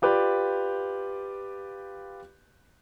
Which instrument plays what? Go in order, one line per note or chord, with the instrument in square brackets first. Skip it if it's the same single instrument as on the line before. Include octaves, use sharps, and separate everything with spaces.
[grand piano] F4 G4 B4 D5